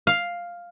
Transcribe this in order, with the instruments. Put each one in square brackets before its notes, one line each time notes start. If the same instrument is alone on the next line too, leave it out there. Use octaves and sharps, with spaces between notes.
[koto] F5